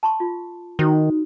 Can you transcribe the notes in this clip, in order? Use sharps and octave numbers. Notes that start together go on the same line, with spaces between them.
A5 C6 C#6
F4
D#3 D#4 F#4 C5